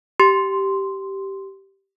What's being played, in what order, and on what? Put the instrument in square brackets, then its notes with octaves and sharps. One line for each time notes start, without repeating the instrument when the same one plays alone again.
[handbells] G4 C6